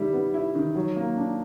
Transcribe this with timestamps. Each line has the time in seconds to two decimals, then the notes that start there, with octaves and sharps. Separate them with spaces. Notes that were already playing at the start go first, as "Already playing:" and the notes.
Already playing: D#3 G3 E4
0.13 B3
0.34 E4
0.55 D#3
0.75 F#3
0.96 A#3
1.17 D4